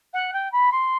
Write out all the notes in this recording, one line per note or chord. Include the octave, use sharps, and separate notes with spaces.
F#5
G5
B5
C6